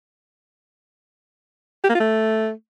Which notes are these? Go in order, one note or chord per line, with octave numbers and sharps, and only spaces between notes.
G4
A#3
F4
A3